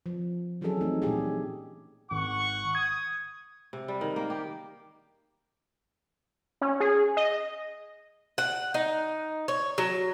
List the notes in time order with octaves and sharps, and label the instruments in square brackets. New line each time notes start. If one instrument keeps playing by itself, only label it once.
[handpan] F3
E3 F#3 C4 C#4 G#4 A4
E3 A3 C4 D#4
A#2 D4 G4 G#4
[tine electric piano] G#1 [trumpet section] F#5 C#6
[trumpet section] D#6 [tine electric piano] G#6
[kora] C3
G3
D#3
A#3
G4
[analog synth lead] C#4
G#4
D#5
[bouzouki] F#5
D#4
C#5
F#3